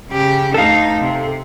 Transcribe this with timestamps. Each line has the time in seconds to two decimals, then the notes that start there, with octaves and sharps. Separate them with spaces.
0.11 C#3 G4
0.54 D2 D#4 A4 F5
1.00 C3